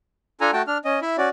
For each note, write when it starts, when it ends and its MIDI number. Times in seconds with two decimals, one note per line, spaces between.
0.41 0.51 62
0.41 0.51 65
0.41 0.51 69
0.41 0.51 80
0.41 0.51 82
0.53 0.62 57
0.53 0.62 66
0.53 0.62 79
0.53 0.62 81
0.67 0.78 62
0.67 0.78 89
0.85 0.99 61
0.85 0.99 75
1.02 1.17 64
1.02 1.17 76
1.18 1.29 61
1.18 1.29 66
1.18 1.29 74